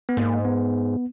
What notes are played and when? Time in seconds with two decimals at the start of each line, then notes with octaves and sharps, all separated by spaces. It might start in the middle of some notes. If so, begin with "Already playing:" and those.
0.09 B3
0.17 G#2 A#3
0.45 B3